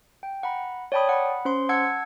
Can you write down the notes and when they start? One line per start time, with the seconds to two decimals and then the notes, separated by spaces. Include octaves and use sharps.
0.23 G5
0.43 F#5 A#5 B5
0.92 C#5 D5 G5 A5 B5 D#6
1.09 F#5 B5
1.45 C#4 C5 C6
1.69 F#5 A5 E6 G#6 C#7